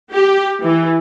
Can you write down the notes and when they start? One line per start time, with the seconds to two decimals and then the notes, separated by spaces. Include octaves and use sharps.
0.11 G4
0.60 E3